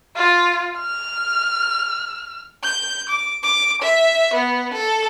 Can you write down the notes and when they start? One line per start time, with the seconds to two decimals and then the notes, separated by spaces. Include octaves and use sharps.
0.16 F4
0.80 F6
2.63 G6
3.09 D6
3.43 D6
3.82 E5
4.34 B3
4.73 A4